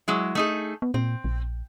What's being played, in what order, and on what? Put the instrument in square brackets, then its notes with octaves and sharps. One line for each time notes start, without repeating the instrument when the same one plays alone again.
[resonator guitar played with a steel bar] F#3 G#3 E4
A3 D#4 G#4
[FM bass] B3
[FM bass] A#2 [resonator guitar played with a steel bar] C4
[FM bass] A#1